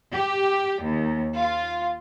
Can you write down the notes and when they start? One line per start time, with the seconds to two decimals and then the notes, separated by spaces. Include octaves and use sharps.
0.13 G4
0.84 D#2
1.36 F4